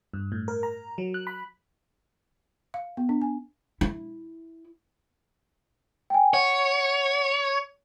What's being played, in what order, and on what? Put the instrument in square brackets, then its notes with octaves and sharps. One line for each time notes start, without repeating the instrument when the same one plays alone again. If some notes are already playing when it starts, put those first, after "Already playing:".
[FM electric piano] G2
A2
A#4
A#5
F#3
F#6
B5
[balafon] F5
B3
D4
G#5
[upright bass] E4
[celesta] G5 G#5
[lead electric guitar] C#5 [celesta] F#5